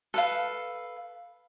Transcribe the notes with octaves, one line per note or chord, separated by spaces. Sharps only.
A4 B4 F5